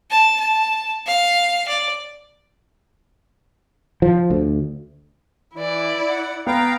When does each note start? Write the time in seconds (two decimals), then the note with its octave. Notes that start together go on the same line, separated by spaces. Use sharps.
0.10 A5
0.40 A5
1.06 F5
1.68 D5
4.02 F3
4.30 D2
5.55 E3 E4 D5
6.09 F#5
6.47 B3 F5 G5 A#5